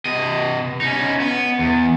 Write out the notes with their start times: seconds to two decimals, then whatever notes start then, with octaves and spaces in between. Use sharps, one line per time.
0.05 C3 D#5
0.81 C#4 D#4
1.20 B3
1.59 E2